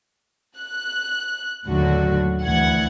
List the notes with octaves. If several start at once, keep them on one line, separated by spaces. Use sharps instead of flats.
F#6
D#2 A2 D3 F#3 F#4
D2 E3 F#5 G#6